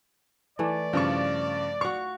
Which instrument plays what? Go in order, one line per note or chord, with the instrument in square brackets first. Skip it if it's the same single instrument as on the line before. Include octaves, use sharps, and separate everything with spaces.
[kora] E3 A3 [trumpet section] D5
[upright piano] G2 C#3 C#6 [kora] F3
[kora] F#4 F5 [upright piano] C#6